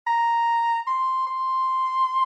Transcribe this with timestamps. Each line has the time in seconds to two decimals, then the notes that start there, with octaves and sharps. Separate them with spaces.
0.07 A#5
0.87 C6
1.27 C6